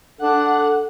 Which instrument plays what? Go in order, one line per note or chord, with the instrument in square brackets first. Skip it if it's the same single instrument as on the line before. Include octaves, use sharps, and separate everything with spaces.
[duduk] D4 [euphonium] A4 [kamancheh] F#5